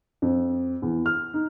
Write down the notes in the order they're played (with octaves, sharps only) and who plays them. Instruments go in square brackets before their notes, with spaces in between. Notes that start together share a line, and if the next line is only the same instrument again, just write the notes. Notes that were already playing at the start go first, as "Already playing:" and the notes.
[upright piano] F2
E2
F6
D#4